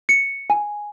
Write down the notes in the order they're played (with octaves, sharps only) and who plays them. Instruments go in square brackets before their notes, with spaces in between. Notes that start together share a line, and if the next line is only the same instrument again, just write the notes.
[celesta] C#7
G#5